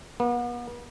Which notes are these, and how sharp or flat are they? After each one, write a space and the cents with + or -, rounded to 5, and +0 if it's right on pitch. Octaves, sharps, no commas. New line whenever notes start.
B3 -40